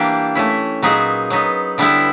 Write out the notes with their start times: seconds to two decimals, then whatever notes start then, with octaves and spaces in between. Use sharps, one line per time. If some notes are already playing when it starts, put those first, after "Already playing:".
Already playing: E3 G3 A#3 D4 G4
0.35 A3 C#4 E4
0.82 A#2 F#3 B3 D#4 G#4
1.30 F#3 B3 D#4
1.78 D3 G3 B3 E4